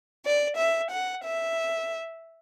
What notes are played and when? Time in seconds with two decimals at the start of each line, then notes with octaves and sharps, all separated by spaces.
0.23 D5
0.57 E5
0.91 F#5
1.24 E5